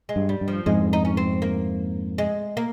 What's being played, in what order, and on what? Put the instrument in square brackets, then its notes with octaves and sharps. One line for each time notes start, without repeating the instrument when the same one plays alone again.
[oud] G#3
[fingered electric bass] G2
[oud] G3
[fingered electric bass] G2
[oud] F3
[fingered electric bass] F2 G#2 [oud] G#3
[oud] D#4
C#4
C4
A#3
G#3
A#3